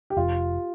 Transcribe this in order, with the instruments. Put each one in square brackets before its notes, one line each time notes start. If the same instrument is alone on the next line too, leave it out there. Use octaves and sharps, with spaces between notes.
[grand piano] G4
[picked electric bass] F1 [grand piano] F4